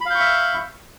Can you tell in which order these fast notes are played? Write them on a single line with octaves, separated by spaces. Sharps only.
B5 F5 G6 C#6 E5